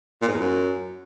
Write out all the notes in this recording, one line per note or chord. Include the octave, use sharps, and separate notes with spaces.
A#2
G#2
E2
F#2